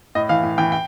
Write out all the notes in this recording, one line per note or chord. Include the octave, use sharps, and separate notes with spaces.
A2 D#5
E3 F5
A2
E3 G5
G5